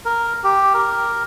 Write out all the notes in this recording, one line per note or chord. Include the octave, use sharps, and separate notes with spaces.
A#4
G4
A#4